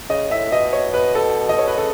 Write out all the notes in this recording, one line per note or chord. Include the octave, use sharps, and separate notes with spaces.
C#3 D#5
A2 E5
B2 D#5
C#5
B4
A4
D#5
C#5
B4
C#3 A4